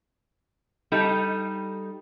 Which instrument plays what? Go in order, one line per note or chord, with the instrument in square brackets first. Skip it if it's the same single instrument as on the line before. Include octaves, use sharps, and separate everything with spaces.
[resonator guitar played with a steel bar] G3 D#4 A4